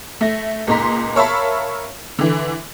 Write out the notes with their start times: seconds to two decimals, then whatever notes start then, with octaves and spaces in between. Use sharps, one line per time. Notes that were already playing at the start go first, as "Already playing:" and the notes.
0.21 A3 A#6
0.67 C#2 A#2 D#4 A#5 C6 B6
1.15 A#4 C#5 E5 F5 A5 B5
2.19 D3 E3